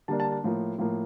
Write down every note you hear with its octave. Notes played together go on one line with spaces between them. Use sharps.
D3 G3 A#3 D4 A5
A5
A5
A2 F3 A#3
A2 F3 A#3